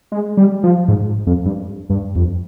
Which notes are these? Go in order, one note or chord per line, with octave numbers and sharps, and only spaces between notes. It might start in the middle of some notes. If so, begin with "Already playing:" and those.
G#3
G3
F3
G#2
F2
G2
G2
F2